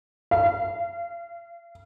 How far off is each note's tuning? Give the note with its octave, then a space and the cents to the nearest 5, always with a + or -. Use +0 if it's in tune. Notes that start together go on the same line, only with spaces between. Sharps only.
F5 -30